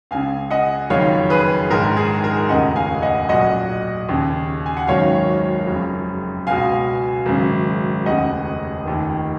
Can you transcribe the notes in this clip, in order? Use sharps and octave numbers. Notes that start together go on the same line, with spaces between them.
C#2 C#3 F5 G#5
D#5 F#5
F#1 F2 D#3 C#5 F5
G#4 B4
A#1 G#2 D#3 A#4
G#4
A#4
F1 D#2 C#3 D#5 F#5
F5 G#5
D#5 F#5
B1 A#2 D#5 F#5
D#2 C#3
G#5
F#5
G#1 F#2 D#3 C#5 F5
F#1 F2 C#3
C#2 B2 F5 G#5
G#1 F#2 C#3
F1 D#2 C#3 D#5 F#5
F1 D#2 D#3